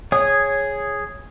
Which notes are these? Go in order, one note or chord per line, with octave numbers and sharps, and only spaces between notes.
G#4 C#5 D#6